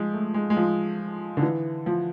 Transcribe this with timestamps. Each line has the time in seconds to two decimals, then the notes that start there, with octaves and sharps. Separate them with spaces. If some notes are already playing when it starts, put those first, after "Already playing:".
Already playing: F3 G#3
0.13 A3
0.34 G#3
0.50 G#3
0.56 F3
1.37 D3
1.42 E3
1.86 F3